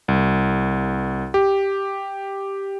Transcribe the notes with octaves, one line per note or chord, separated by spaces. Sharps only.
C2
G4